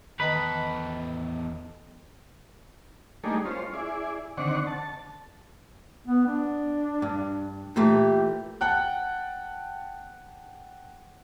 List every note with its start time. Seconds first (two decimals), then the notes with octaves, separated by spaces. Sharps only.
0.20 E2 D#3 A4 B4 D#5 G5
3.24 G3 A3 A#3 D4 D#4 G#4
3.45 C#4 F4 C5
3.73 E4 G#4 D5
4.37 D3 D#3 C4 D4 F#5 C#6
4.67 A5
6.07 B3
6.26 D4
7.02 G2
7.76 A#2 E3 A3 G4
8.61 F#5 G5 A5 F#6